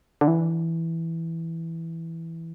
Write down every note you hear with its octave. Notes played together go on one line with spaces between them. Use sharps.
D3
E3